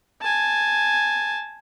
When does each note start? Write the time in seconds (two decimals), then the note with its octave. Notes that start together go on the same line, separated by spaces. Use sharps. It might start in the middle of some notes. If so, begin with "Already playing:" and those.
0.22 G#5 A5